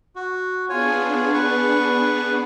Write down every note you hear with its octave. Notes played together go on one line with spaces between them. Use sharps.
F#4
B3 D4 F4 G#4 C#5 G#5
B4 C#6